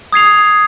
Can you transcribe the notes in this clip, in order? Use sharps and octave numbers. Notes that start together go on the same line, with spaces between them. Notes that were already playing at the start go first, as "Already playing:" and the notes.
D#6 G#6 C7 F7